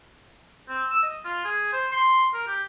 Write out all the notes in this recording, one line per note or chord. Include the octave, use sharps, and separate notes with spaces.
C4
E6
D#5
F4
G#4
C5
C6
A#4
G4